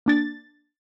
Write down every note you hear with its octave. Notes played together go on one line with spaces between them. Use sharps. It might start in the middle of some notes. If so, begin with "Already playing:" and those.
A#3 D4 A6